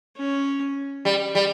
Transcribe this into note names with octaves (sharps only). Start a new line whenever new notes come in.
C#4
G3
G3